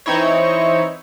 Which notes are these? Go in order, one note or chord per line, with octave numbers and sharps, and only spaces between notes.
E3 C4 D#4 E4 C#5